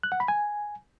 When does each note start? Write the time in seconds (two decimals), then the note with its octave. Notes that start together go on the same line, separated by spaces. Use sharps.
0.03 F#6
0.12 F#5
0.20 B5
0.28 G#5